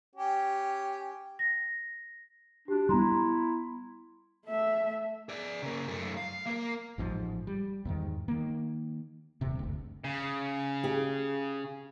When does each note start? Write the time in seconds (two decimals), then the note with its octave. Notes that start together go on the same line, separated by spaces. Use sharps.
0.15 C#4 G4
1.39 A#6
2.68 D4 F#4 G4
2.89 G3 B3 E4 A#5 C6
4.46 A3 E5
5.29 G#4 D5
5.63 C#3 A#3
5.88 F#2 A3
6.17 F5
6.46 A#3 A#4
6.98 A1 G#2 D3 F3
7.47 G3
7.85 E2 G#2 D#3
8.28 D#3 A#3
9.41 D#1 C3
9.59 F#1 D2
10.04 C#3
10.83 G4 G#4